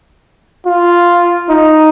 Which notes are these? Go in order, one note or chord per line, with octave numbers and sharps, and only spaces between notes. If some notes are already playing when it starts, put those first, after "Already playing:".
F4
D#4